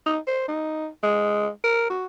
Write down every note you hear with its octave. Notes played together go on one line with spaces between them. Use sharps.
D#4
C5
D#4
G#3
A#4
F#4